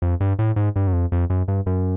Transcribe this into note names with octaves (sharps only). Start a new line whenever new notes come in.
F2
G2
A2
G#2
G2
F#2
F2
F2
F#2
G2
F#2